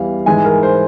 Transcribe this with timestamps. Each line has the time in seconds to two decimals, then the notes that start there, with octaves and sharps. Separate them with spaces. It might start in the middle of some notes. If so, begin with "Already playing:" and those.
Already playing: E2 E3 G3 F5
0.26 G#2 E3 G#3 G#5
0.45 A#4
0.63 C5